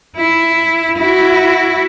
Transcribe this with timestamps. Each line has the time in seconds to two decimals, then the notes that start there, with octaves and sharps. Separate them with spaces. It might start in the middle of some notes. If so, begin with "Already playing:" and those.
0.16 E4
0.98 E4 F#4